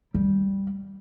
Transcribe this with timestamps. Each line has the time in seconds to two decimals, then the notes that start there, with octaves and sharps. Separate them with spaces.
0.14 G3